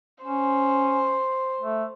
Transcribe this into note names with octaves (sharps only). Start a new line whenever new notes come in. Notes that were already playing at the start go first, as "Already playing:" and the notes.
C#4 C5
A3